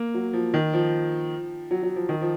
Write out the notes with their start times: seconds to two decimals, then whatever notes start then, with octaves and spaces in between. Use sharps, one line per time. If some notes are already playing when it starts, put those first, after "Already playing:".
Already playing: A#3
0.14 F#3
0.33 F3
0.54 D#3
0.73 F3
1.71 F#3
1.83 F#3
1.96 F3
2.09 D#3
2.21 F3